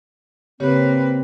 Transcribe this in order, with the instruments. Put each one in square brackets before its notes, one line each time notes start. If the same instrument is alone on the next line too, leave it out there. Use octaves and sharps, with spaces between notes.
[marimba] C#3 G4 C#5 [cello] A#3 B4 [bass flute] C4